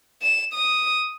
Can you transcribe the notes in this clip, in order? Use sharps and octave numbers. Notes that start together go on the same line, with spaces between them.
E7
D#6